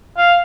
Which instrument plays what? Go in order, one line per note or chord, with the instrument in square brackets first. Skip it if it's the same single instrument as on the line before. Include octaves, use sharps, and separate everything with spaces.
[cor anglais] F5